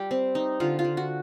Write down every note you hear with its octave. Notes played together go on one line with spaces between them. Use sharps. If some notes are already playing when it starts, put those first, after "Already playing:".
Already playing: G3 G4
C4
D#4
D3 F4
F4
D3
F#4